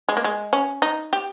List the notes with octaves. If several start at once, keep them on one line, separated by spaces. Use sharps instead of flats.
G#3
A#3
G#3
C#4
D#4
G4